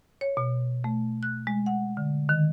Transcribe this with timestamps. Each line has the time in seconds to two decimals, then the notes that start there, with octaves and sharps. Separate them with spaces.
0.21 C#5
0.37 B2
0.84 A3
1.23 F#6
1.47 G#3
1.66 F#5
1.97 D3
2.29 D#3